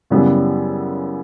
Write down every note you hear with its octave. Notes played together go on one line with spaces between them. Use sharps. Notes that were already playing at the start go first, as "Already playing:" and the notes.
F#2 C#3 E3 G3 B3